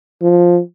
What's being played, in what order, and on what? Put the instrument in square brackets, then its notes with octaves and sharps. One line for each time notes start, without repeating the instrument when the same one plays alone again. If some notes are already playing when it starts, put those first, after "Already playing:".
[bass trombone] F3